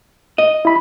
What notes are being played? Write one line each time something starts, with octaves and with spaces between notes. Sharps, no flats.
D#5
E4 B5